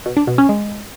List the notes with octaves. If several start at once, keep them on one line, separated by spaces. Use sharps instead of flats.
B2
D4
B2
C#4
G#3